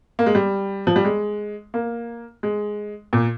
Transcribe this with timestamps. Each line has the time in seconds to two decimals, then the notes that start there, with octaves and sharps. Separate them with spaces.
0.19 A#3
0.26 G#3
0.35 G3
0.87 F3
0.96 G3
1.05 G#3
1.74 A#3
2.43 G#3
3.13 A#2